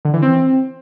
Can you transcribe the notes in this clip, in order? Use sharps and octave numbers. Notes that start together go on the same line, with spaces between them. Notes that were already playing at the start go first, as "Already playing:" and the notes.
D3
E3
C4